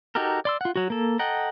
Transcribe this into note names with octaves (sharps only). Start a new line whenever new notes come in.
D#4 F#4 G4 A4 A#4
D5 C6 E6
F4 F#5
F#3 F#4
A#3 A4
A4 D#5 F#5 G5 A#5